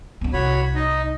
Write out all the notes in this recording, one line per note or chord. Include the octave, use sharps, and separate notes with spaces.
B3 D4
C2 F#4 C#5 B5
D#4 D#5